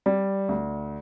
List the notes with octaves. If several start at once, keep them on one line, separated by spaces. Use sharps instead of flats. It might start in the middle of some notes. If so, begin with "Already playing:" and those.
G3 D5
D2